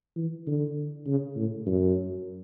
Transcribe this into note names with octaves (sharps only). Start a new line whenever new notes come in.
E3
D3
C#3
A2
F#2